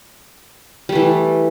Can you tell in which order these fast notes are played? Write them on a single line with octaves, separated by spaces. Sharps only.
G3 A3 E3